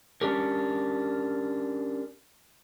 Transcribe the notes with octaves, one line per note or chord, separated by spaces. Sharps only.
C#4 D4 G4 A#4